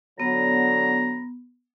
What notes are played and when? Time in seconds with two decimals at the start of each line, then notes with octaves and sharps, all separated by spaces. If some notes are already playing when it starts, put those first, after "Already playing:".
0.20 D3 F#3 B3 A#5